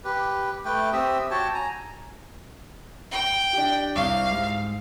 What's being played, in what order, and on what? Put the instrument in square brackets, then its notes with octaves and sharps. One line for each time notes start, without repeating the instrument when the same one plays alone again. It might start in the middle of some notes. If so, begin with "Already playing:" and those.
[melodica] G4 B4
A3 B4 G5
C4 G4 E5 D#6
F#4 C#5 G5 A5
G#5 A#5
[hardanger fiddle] G5
[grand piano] D4 G4
[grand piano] C2 C#6 D6 [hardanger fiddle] F5
[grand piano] G#2